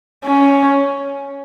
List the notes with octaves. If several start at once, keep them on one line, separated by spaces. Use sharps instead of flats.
C#4